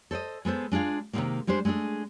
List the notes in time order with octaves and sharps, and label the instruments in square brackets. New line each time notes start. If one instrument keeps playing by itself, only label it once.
[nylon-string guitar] A4 C5 D5 D#5
G#3 B3 A4 C5
G#3 D4 F4 G#4 F5
C3 D#3 F3 F#3 G#3 A#3
G3 G#3 D4 G4 C5
G#3 A3 C#4 D4 G#4